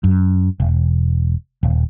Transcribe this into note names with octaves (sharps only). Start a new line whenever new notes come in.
F#2
E1
D#1